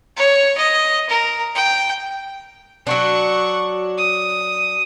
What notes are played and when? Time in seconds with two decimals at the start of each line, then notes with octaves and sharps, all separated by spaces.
0.17 C#5
0.58 D#5
1.09 A#4
1.55 G5
2.87 F#3 D4 F#5 C#6
3.97 D#6